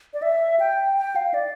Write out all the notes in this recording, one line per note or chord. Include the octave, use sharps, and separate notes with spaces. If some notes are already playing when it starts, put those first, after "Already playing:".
D5
E5
G5
G5
F5
D5